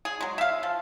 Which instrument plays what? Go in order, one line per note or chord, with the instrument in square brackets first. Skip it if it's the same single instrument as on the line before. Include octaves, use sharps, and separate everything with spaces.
[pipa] G#4
F#3 G#3
E5 F5
F3